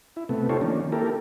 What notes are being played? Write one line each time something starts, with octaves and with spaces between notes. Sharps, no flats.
E4
C3 A3 B3
D#4 F4 G4 A4 C5 C#5
D#3 F3 A#3 C#4 D4
A#3 E4 G4 A4 A#4